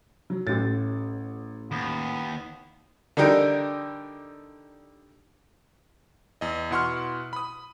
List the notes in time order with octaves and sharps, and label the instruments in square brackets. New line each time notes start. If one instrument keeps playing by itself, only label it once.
[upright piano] F#3
[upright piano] A1 A6 [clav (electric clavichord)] A2
[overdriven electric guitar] D#2 [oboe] B3
[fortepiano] D3 G3 D4 D#4 G4 A#4
[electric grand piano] E2 D#5
B2 E4 F#5 C6 C#6 F6
B5 D#6